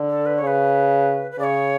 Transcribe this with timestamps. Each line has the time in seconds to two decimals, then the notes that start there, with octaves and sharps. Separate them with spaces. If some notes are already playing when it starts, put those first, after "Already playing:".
Already playing: D3
0.09 A4
0.26 B4
0.37 C#3 C#5
0.47 B4
1.31 B4
1.38 C#3 D5
1.44 C#5